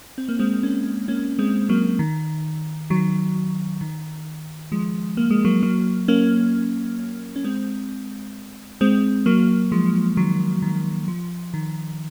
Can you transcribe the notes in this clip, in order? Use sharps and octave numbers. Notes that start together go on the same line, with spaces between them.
C4
A#3
G#3 C4
A#3 C#4
A#3 C#4
G#3 C4
F#3 A#3
D#3
D#3 F#3
D#3
F3 G#3
A#3
G#3
F#3 A#3
F#3 A#3
A#3 C#4
C#4
G#3 C4
G#3 C4
F#3 A#3
F3 G#3
D#3 F#3
D#3
F3
D#3